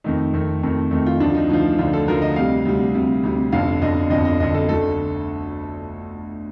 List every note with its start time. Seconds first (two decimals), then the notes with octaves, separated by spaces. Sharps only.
0.04 F2 D#3 A3 D#4
0.33 F2 D#3 A3
0.63 F2 D#3 A3
0.91 F2 D#3 A3
1.06 F4
1.20 D2 D3 F3 D4
1.34 D#4
1.49 D2 D3 F3 D#4
1.78 D2 D3 F3 F4
1.93 A4
2.08 D2 D3 F3 A#4
2.22 D#5
2.36 D2 C3 G3 F5
2.65 D2 C3 G3
2.95 D2 C3 G3
3.23 D2 C3 G3
3.52 G1 F2 D3 F5
3.82 G1 F2 D3 D#5
4.10 G1 F2 D3 D#5
4.25 D#5
4.40 G1 F2 D3 D#5
4.54 A4
4.68 D2 D3 A3 A4